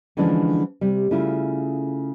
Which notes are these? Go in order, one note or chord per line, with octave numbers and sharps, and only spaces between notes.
D3 E3 F3 G#3 C#4 D4
C3 G3
C#3 A3 E4 F4